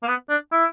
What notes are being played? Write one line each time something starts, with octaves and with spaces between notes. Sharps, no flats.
A#3
B3
D4
E4